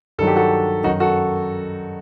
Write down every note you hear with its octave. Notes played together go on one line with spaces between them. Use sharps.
G2 D#3 F#3 A4
G4
F#4 A4
F#2 D#3 F#3 D#4 F#4
F#4 A4